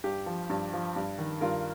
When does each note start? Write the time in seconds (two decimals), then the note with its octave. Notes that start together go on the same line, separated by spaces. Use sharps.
0.04 G2 G4
0.26 F3
0.50 G2
0.73 F3
0.96 G2
1.18 D#3
1.41 G2 F4 A#4